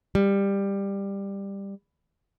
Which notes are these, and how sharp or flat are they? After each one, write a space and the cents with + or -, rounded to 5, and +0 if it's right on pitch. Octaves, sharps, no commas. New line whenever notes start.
G3 +15